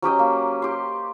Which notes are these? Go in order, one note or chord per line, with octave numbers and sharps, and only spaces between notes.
F#3 C#4 G4 D#5
A#3
G4 C6